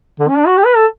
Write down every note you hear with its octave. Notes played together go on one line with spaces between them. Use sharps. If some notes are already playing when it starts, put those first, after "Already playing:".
D3
C#4
D4
F#4
G4
B4
A4